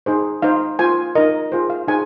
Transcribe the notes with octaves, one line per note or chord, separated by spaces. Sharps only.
D#4 G#4 C5
D#4 C5 F5
F4 C5 G#5
D#4 A#4 D#5
F4 G#4 C5
F5
D#4 G#4 C5 G#5